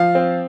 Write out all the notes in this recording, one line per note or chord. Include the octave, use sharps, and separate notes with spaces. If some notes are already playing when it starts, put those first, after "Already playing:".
Already playing: F3 F5
C4